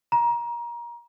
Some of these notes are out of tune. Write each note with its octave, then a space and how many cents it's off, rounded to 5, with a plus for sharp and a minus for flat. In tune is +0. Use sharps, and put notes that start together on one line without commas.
A#5 +25